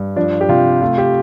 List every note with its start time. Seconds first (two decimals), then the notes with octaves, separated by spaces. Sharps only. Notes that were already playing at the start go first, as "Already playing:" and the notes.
Already playing: G2
0.16 F3 D4
0.41 G4
0.49 C3 F4
0.81 A3 F4
0.98 G4